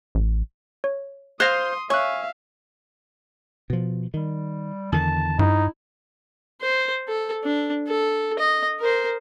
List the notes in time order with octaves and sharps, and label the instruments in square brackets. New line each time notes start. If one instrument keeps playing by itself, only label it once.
[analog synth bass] A1
[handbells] C#5
[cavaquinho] C5 F5 [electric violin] C6 D#6 [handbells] F#6 G#6 A#6
[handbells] C#5 F#6 [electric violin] E5 F5 [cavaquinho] G#5 C#6
[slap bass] B2 F3
[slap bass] D#3 [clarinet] G3
[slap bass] E2 D3 D#3 [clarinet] A5
[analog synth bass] G2 [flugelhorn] D#4 [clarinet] E4
[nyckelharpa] C5
A4
D4
A4
D#5
A#4 C5